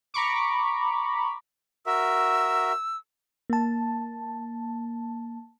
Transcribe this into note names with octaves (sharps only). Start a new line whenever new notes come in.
A#5 B5 C#6 D6
F#4 A#4 E5 E6
A#3 A5